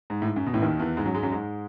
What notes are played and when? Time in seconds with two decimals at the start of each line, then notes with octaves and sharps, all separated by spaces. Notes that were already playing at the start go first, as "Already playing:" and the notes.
0.10 G#2
0.22 A2
0.27 G#2
0.36 F#2
0.46 B2
0.53 A1 A2
0.62 D#2 D#3
0.79 E2 E3
0.97 G#2 G#3
1.06 F#2 F#3
1.14 G#2 G#3
1.23 F#2 F#3
1.31 G#2 G#3